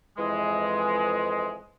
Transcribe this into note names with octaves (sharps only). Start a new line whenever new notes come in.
F2 E3 G#3